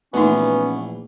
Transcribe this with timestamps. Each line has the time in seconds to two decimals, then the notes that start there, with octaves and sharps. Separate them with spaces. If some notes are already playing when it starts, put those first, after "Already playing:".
0.14 A#1 E3 A3 B3 C#4 D#4